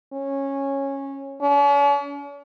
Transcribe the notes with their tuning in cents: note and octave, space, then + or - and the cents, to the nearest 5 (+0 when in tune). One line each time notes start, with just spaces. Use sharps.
C#4 -15
C#4 +45